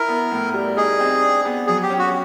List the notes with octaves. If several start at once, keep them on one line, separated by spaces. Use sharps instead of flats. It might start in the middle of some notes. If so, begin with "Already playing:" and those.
Already playing: E4 A#4
B3
A2
G3
D#4 G#4
C4
D4
B3
F#3 G#4
G4
C#4
F#4